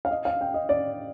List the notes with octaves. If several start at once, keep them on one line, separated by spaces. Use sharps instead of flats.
F5
D#5
F5
G5
D#5
D5